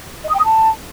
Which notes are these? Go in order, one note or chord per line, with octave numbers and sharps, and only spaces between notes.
D#5
D#6
G5
D#6
A5